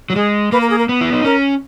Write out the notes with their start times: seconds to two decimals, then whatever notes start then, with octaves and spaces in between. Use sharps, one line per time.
0.10 F#3 F#4
0.16 G#3 G#4
0.52 A#3 B4
0.61 A#4
0.70 G#4
0.78 A#4
0.89 B3
1.01 E4
1.13 D#4
1.24 C#4 A#4